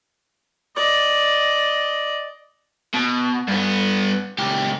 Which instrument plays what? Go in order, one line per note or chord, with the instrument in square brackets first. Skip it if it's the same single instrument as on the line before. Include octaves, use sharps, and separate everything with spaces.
[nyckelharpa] D5 D#5
[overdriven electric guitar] B2
G2 B3
C#2 G4